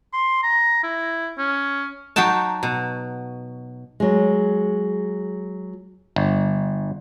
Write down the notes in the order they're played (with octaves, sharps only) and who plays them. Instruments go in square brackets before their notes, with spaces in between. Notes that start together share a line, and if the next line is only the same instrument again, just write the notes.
[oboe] C6
A#5
E4
C#4
[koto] F#3 D#4 F#4 G5 A5
B2
[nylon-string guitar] F#3 G#3
[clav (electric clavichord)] G1